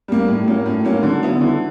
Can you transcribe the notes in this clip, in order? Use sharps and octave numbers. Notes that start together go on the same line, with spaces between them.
G3 A#3
A2
F#3 A#3 C#4
A2
F#3 A#3 C#4
D3
F#3 B3 E4
D3